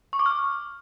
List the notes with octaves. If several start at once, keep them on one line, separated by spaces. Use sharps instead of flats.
C#6
D6
F6